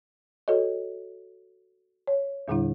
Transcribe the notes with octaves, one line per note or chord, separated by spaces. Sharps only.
F#4 A4 C#5 D#5
C#5
E2 A#2 D3 G3 D4 E4